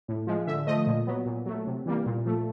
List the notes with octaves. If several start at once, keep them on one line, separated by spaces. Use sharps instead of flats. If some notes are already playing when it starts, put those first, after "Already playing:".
A2
F3 G#3
D3 E5
F3 A3 D#5
A#2
F#3 B3
A#2
F#3 A3
C3
E3 G3 A#3
A#2
F3 A3